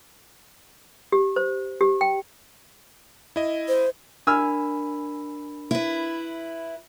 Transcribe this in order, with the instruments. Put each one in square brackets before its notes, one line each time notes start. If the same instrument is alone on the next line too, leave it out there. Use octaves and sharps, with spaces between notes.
[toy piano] G4
C5
G4
G5
[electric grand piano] E4 D#5
[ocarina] C5
[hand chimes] D4 A#4 B5 [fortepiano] G#5 E6 F6
[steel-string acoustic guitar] E4 B4